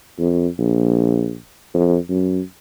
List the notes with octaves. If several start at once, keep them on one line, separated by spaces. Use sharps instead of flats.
F2
A#1
F2
F#2